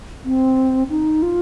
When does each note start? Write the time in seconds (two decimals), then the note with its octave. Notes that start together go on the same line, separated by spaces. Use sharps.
0.25 C4
0.90 D#4
1.22 F4